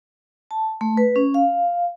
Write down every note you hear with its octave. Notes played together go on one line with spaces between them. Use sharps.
A5
A3
B4
C#4
F5